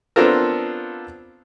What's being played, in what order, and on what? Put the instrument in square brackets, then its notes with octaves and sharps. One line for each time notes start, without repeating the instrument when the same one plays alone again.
[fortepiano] B3 C4 D4 F4 A4 A#4